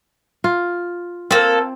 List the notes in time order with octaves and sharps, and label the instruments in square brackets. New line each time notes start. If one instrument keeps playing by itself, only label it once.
[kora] F4
[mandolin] A#3 A4 [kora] C4